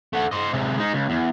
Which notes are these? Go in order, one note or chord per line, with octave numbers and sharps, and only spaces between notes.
A3 F#5
C5 D#5
C3 G#3
G#3 D#4
C#2
E2